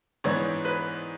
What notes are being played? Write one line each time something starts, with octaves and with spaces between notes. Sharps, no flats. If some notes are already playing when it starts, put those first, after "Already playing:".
G#2 E3 B3 D4 C#5
B4